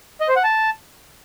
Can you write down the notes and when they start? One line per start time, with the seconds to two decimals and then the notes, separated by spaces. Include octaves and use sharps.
0.21 D#5
0.28 C5
0.36 F#5
0.44 A5